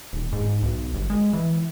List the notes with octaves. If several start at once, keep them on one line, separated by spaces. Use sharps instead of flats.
D#1
G#2
B1
G1
G#3
E3